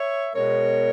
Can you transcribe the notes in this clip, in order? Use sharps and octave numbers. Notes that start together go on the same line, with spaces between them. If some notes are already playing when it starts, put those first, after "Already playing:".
Already playing: C#5 E5
B2 G#3 B3 A#4 C#5